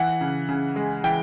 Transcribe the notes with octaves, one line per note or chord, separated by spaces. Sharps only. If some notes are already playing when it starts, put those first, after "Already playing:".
Already playing: E3 F#5
C#3
C#3
G#3
E3 G5